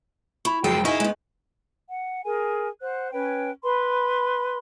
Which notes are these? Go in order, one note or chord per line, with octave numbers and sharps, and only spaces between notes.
E4 B5 C#6
F#1 F3 F#3 G#3 G#4 G5
D#4 E4 D#5 F5 G#5 C#6
G#3 B3
F#5
G#4 A#4 G#5
C5 F#5 F#6
C#4 B4 C#5 G5
B4 B5 C6